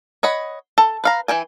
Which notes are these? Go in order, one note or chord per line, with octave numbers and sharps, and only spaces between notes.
C#5 D#5 F#5 B5
A4
B4 F5 A#5
E3 E4 G5 G#5